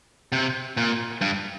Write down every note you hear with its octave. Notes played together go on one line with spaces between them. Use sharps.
C3
A#2
G2